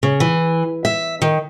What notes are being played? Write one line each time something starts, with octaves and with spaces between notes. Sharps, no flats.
C#3
E3
E5
D#3